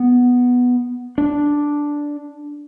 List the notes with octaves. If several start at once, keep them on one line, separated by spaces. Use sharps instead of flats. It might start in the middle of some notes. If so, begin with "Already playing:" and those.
Already playing: B3
D4